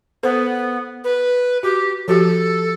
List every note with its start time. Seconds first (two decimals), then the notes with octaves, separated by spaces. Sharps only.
0.23 B3 A4 C5
1.04 B4
1.63 F#4 G4
2.08 F3 F#4 G4 A4